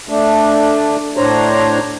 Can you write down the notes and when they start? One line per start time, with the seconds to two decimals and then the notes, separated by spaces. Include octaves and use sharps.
0.09 A3 D4
1.17 A2 D4 C5 C#5 A#5